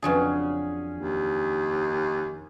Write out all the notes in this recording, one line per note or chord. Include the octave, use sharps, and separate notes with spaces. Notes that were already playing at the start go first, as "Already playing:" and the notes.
F2 C#3 F#3 C#4 D4 G#4
D#2